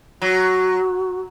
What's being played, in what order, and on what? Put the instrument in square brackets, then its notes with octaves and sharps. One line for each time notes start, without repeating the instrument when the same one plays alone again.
[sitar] F#3 [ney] F#4